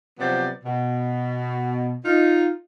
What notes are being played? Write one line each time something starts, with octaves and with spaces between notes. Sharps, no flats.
C3 F3 F#3 B3 C5 D5
B2
D#4 F4